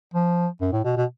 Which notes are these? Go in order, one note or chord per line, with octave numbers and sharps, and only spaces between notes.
F3
F#2
A2
B2
B2